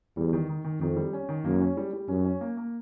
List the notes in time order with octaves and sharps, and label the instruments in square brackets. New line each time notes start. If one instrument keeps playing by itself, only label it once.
[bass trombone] E2 [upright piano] G3
[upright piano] D#3
D#3
D#3
[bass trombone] F2 [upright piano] D#3
[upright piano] G3
C#4
D#3
[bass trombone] F#2 [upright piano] A#3
[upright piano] C#4
G3
G3
[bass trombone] F#2 [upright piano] C#4
[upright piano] C#4
A#3
A#3